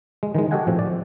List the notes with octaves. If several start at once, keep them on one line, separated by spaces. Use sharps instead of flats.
G#3
D#3 E3 G#3
F#4 G4 A4 D#5 F#5 G#5
A2 F3 C4
D5